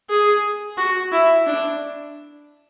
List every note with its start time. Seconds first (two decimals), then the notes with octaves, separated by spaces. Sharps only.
0.10 G#4
0.77 F#4
1.12 E4
1.47 D4